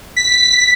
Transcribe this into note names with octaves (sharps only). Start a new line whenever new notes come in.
B6